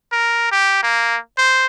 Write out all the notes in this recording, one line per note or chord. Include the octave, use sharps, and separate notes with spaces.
A#4
G4
A#3
C5